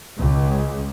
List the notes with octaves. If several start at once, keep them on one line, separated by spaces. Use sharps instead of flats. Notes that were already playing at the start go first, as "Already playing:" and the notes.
C#2